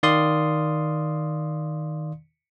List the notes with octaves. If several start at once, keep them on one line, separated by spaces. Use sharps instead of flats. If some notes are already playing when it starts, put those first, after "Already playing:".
D#3 D5 F5 C6 D#6